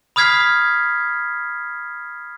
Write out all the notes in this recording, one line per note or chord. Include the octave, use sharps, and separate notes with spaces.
B5 D#6 F6 G#6 B6 C7